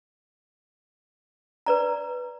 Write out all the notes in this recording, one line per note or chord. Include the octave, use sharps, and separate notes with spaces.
B4 D5 A#5